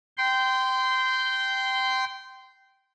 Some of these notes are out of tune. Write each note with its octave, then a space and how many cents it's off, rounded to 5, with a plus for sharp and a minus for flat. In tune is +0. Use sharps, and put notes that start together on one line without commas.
G5 -10 C6 -20